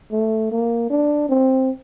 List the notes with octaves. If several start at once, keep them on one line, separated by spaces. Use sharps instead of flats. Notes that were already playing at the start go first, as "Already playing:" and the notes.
A3
A#3
D4
C4